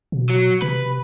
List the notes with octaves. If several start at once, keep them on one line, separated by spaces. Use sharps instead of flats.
B2
F#3
C3 B4